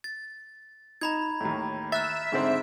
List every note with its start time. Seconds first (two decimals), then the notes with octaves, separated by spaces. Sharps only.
0.04 A6
1.01 D#4 A#5 B5 G#6
1.40 D#2 A2
1.92 E5 F6 F#6 A6
2.32 G#2 D3 C4